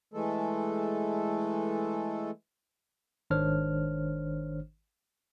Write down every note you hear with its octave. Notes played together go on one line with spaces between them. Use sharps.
E3 G#3 A3 A4
G#1 D#3 D4 C5 C#5 F6